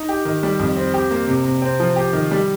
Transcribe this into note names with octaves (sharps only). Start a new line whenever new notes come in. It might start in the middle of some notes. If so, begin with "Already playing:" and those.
Already playing: D#4
G4
D#3
G3
F2
C4
G4
A#3
C3
C3
C4
F3
G4
D#3
G3